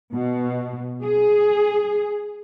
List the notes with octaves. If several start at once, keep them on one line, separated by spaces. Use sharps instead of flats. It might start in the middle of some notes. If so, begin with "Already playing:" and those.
B2
G#4